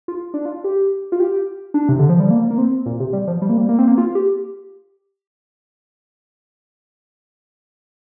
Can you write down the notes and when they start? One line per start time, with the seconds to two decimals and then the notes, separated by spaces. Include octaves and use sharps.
0.08 F4
0.34 D4
0.45 F4
0.64 G4
1.12 F4
1.20 G4
1.74 D4
1.89 C3
1.99 D3
2.09 F3
2.20 G3
2.30 A#3
2.51 A#3
2.58 C4
2.86 A#2
3.00 C3
3.13 G3
3.28 F3
3.42 G3
3.49 A#3
3.57 G3
3.69 A#3
3.79 C4
3.88 A#3
3.98 F4
4.15 G4